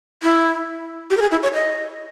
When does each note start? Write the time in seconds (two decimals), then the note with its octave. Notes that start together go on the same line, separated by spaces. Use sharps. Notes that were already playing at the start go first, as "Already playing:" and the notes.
0.23 E4
1.10 G4
1.17 A#4
1.21 G#4
1.31 E4
1.43 C#5
1.54 D#5